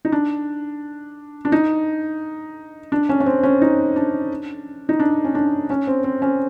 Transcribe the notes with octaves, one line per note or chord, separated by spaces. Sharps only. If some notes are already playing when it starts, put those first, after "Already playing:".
D#4
D4
D4
D#4
D4
C#4
C#4
C4
C#4
D#4
D4
D#4
D4
C#4
D4
C#4
C4
C4
C#4